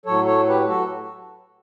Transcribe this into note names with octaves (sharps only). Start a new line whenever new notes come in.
A2 F#3 A4 C#5
A4 C#5
G4 B4
F#4 A4